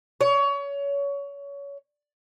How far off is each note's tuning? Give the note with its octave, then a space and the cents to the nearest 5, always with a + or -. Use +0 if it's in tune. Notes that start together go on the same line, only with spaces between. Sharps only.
C#5 +25